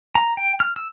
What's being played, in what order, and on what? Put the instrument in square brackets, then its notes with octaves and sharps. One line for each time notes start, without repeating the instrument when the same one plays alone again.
[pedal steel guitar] A#5
G5
F6
E6